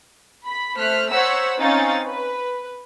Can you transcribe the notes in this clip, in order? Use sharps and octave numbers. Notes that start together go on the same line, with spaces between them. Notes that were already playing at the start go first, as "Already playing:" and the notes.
B5 B6
A3 C5 F6 F#6 B6
C5 C#5 F#5 A#5 E6 B6
C4 C#4 D#4 C#5 F5 A6
B4